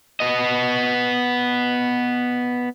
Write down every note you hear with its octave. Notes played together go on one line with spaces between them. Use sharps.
B3 D#5